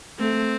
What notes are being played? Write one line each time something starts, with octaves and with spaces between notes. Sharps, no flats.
A3 C4